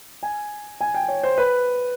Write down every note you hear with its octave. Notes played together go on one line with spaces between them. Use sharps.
G#5
G#5
G5
C#5
C5
B4